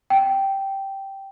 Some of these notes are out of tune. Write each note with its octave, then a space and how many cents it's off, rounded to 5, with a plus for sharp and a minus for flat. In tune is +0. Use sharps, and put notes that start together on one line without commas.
G5 -10